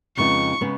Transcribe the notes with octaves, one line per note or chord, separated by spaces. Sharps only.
F2 C#3 G#3 B3 D#4 C#6
C#3 G#3 B3 D#4